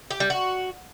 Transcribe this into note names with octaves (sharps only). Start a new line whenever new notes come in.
G4
G3
F#4